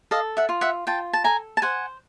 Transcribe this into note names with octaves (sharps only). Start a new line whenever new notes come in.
A4 D#5 F5
E5 F#5
F4
E5 F#5
F4 G5 A5
A5
A4 G#5 A#5
A5
C5 F#5 G#5